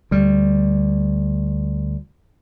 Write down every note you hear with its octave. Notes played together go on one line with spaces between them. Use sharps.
D2 G3